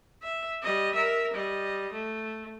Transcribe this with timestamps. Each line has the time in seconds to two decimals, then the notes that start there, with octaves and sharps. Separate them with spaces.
0.23 E5
0.62 G3 D#5
0.95 A#4 E5
1.34 G3 D#5
1.93 A3